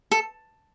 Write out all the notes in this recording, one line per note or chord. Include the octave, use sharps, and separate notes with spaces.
A4